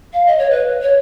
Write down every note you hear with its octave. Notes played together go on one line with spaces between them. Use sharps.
F5
D#5
C#5
B4
C#5